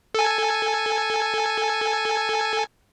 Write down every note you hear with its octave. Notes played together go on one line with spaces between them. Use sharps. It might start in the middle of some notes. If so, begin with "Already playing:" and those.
A4 G#5